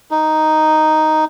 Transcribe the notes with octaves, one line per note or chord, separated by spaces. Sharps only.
D#4